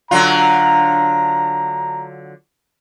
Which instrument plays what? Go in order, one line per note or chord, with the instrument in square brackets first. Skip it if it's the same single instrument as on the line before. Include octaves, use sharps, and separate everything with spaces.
[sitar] D3 F#3 F4 [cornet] A#5